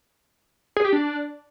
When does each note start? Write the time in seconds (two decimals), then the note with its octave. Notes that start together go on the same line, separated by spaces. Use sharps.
0.77 G#4
0.85 G4
0.93 D4